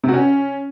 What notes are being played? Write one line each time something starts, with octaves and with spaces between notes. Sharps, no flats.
C3
F#4
C#4